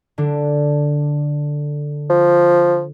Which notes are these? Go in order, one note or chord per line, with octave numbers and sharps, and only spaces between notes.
D3 D4
F3